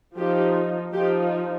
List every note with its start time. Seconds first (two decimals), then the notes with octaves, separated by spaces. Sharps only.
0.16 F3 D#4 G4
0.93 F3 D#4 G4